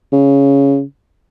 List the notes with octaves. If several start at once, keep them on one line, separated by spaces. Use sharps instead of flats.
C#3